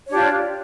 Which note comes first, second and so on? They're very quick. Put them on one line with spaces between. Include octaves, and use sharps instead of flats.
C#5 D4 G4 F4